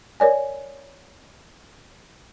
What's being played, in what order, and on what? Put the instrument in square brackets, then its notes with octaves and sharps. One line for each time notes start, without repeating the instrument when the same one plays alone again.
[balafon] A#4 C#5 D5 G#5